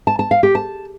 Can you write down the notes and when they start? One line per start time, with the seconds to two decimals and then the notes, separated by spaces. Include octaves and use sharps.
0.07 A5
0.19 A5
0.31 F5
0.43 G4
0.55 A5